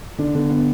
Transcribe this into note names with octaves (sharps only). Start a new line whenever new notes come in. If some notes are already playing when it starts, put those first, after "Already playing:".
D3 D4
D3 B3
B3